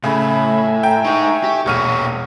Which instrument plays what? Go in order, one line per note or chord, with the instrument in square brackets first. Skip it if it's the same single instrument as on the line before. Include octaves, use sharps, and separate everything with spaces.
[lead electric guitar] A2 [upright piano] C#3 [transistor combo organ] E5 G#5 [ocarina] B5
[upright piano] G5 [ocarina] A#5
[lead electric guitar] D#4 G#4 [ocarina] C#6
[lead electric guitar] G4
[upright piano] E1 F6 D#7 [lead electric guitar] A#2 C#5 [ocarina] C#6